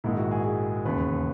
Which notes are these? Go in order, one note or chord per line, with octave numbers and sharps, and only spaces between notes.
A#1 G#2 D#3 G#3 E4
F#4
G#4
G#4
E1 D#2 C#3 B4